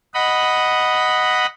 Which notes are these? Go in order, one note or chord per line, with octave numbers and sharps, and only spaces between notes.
D#5 F#5 B5